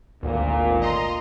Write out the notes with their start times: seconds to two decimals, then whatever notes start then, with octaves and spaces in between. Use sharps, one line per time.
0.23 G#1 D2 A#2
0.82 D#5 A#5 C6